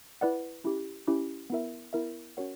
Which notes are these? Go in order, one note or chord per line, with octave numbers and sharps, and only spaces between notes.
E4 B4 D5 F#5
C#4 E4 G4
C#4 E4 G4
B3 E4 A#4 E5
B3 E4 A#4 E5
C#4 F#4 A#4 C#5 F#5